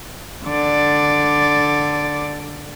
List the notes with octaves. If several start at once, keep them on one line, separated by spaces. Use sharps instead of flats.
D3 D5